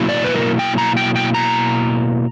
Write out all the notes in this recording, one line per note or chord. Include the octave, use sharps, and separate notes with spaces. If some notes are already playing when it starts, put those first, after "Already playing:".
Already playing: B2 F#3 A#3 E4
D5
B4
A#4
G5
A#5
G5
G5
A#5